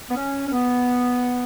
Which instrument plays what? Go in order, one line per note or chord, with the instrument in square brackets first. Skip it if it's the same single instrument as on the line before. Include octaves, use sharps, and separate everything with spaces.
[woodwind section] B3
C#4
C#4
B3